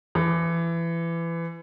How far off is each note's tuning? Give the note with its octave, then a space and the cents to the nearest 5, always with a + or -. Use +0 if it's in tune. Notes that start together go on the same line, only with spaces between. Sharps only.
E3 +25